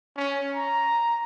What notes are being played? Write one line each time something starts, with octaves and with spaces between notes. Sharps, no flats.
C#4
A#5